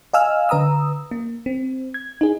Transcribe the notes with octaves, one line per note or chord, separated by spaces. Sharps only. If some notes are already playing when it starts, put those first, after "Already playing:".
D#5 F5 G#5 E6 F6
D3 B4 A#5 D#6 E6
A#3
C4
G#6
D#4 G#4